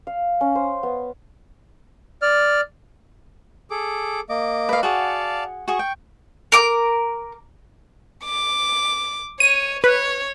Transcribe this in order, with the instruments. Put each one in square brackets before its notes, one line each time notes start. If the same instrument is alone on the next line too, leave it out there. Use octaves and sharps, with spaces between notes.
[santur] F5
C#4
C5
B3
[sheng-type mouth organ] D5 F6
G#4 A4 D6
A#3 D#5 D6
[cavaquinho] B4 F5
[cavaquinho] F#4 G#4 F#5 [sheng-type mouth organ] D5 F5 A5
[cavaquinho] F#4 G#4 [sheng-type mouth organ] C#6
[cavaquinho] G5
[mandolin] A#4 D6
[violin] D6
[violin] C#5 [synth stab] D#7
[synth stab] B4 [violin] C#5